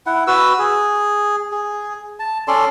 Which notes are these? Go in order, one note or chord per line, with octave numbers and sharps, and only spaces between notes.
E4 F#5
F#4 B4 E6
G#4
G#4
A5
C#4 A4 D5 C6